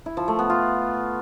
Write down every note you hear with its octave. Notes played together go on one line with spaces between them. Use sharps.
E4
F3
A3
B3
F4